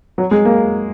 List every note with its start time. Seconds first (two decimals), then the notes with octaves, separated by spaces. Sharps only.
0.18 F#3
0.31 G#3
0.45 A#3